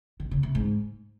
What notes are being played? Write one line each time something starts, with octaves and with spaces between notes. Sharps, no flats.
D#3
C#3
C3
G#2